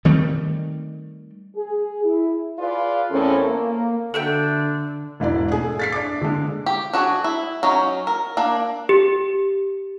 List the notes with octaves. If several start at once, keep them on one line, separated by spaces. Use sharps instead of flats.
D#3 G3 A3 C4
G#4
E4
F4 G#4 B4 D5 F5
E2 A2 C4 C#4 A4 A#4
A#3
D3 D4 F#4 A4 E5 G5
E1 G#2 E4 D5
A3 G#4
A6 B6 C7
D4 D6
D3 G#3
G4
D4 F#4 G#4
E4
F#3 C#4 D#4
A#4
A#3 D4 D5
G4